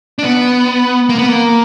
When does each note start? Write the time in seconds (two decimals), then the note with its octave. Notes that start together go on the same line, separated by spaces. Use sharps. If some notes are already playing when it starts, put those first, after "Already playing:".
0.19 D4
0.23 B3
1.09 A#3
1.18 B3
1.29 A#3